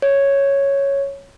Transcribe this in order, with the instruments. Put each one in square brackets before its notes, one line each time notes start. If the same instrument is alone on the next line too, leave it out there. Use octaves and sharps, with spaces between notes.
[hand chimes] C#5